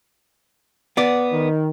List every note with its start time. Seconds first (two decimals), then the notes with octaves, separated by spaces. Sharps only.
0.97 B3 D5
1.33 D#3